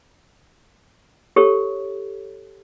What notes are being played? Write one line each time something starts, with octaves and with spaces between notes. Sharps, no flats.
G4 A4 C#5